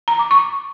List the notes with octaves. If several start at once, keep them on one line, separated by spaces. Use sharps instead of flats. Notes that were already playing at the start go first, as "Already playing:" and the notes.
A#5
D6
C#6